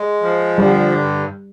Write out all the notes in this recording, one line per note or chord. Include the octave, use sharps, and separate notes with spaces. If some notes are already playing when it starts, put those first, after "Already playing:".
Already playing: G#3
F3
D3 G3
G2